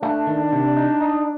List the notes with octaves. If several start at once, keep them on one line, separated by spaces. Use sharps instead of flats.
A3 D4
D#3
C3
D#4
D#4